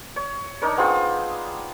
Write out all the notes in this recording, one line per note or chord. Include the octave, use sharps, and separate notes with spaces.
C#5
D4 D#4 A#4 C#5
B3 C4 F4 G#4